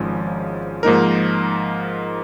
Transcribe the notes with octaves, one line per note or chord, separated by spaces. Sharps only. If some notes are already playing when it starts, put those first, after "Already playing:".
Already playing: G#1 G#2 F3 G#3 C#4
G#2 F3 A#3 D#4 A#4